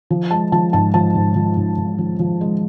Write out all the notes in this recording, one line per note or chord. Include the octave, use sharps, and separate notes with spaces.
F3
G#3 A5
F3 A5
G#2 A5
F3 A5
G#2
F3
G#2
G#2
F3
F3
G#3